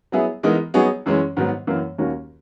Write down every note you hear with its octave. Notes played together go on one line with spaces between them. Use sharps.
F#3 B3 E4 G#4
E3 G#3 B3 D#4 A#4
F#3 B3 D#4 G#4 C#5
F#2 E3 G#3 C#4
G#2 D#3 F#3 B3
F#2 E3 A#3
D#2 D#3 A#3 C#4 F#4